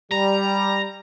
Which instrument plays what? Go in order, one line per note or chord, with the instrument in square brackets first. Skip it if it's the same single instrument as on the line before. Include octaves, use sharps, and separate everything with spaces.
[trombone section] G3 [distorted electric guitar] A#5